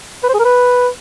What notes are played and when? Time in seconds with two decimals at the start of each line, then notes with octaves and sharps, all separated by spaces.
0.23 B4
0.29 C5
0.34 G#4
0.39 A#4
0.45 B4